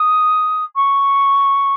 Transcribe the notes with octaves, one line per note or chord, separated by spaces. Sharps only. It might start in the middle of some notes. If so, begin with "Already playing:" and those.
Already playing: D#6
C#6